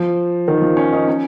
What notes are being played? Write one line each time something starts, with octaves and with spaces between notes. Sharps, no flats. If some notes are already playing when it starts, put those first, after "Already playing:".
Already playing: F3
D#3
F3
C#4
D#4
C#4